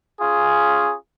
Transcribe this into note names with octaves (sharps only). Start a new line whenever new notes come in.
C#4 F4 G#4